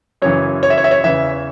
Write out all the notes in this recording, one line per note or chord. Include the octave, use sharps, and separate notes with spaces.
F#2 C#3 E3 C#5
C#5
E5
C#5
E5
C#5
E2 C#3 E3 E5